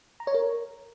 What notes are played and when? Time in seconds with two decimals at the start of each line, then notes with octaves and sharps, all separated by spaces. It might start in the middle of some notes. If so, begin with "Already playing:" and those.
0.20 A#5
0.27 C#5
0.34 A#4